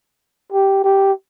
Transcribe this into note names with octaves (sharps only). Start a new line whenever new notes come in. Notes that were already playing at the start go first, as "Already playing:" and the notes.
G4
G4